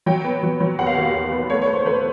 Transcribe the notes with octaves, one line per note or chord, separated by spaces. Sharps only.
F#3 G5
B3
F#3
F#3
D#2 F#5
F5
D#2 F#5
D#2
B3
A3 C#5
C#5
A3
C5
A3 B4